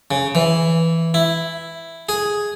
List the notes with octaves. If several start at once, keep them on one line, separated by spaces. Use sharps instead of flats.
C#3
E3
E4
G#4